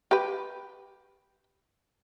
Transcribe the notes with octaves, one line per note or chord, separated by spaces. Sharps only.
G4 B4